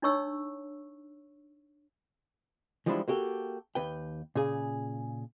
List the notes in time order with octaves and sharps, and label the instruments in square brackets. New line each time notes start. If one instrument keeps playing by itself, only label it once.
[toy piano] D4 D#4 C#5 C#6 E6
[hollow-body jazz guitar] E3 F3 G3 G#3 D4 E4
A#3 F#4 G4 A4
D#2 B4 G5
A#2 C#3 G#4